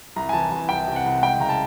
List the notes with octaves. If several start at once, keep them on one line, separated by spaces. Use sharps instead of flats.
C2 A#5
G#5
E3 A5
C2 G#5
C2 G5
C3
F#5
C2
G#3 G5
C#3 A#5
A5